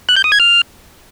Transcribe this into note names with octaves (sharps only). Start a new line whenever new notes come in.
F#6
G6
D#6
G#6
F6